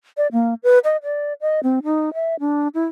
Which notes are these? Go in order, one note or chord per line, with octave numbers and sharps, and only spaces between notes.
D5
A#3
B4
D#5
D5
D#5
C4
D#4
E5
D4
E4